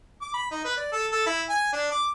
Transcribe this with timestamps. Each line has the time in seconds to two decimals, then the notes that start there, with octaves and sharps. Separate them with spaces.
0.21 D6
0.34 B5
0.51 D#4
0.65 B4
0.77 D5
0.92 A4
1.12 A4
1.27 E4
1.49 G#5
1.73 D4
1.91 D6